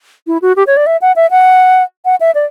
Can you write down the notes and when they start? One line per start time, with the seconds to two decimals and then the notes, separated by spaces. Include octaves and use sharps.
0.27 E4
0.42 F#4
0.56 G4
0.67 C#5
0.77 D5
0.86 E5
1.02 F#5
1.16 E5
1.31 F#5
2.05 F#5
2.20 E5
2.35 D5